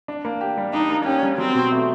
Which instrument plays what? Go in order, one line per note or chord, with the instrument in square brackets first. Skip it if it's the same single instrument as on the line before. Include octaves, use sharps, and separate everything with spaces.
[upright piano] D4
A#3
G4
G3
[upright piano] D4 [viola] D#4
[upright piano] A#3
[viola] C#4 [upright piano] G4
[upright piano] G3
[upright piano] F#3 [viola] C4
[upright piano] B2
A3